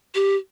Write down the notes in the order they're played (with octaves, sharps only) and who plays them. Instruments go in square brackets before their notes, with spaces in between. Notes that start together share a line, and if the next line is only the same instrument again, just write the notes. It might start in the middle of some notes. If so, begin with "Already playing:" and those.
[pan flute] G4